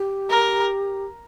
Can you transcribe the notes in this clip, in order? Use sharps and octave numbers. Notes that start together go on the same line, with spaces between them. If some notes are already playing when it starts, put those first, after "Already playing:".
Already playing: G4
A#4